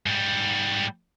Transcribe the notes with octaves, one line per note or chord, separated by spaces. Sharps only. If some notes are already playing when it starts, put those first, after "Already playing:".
G#2 G3